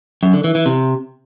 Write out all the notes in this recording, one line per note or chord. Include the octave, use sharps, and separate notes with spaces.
F#2
D3
E3
E3
C3